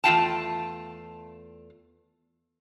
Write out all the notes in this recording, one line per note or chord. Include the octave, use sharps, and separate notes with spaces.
E2 A3 F4 F5 G5 A5